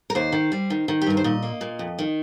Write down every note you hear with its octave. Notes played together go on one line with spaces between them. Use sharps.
A#4
D#2 C5
D#3
G3
D#3
D#3
G4
G2 A#4
C5
A#2 D#5
A#3
A#2
F2
D#3